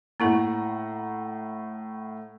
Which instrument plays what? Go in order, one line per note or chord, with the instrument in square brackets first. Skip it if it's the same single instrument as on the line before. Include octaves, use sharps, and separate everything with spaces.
[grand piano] A2 F#5 A#5 [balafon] A#3 E4 A4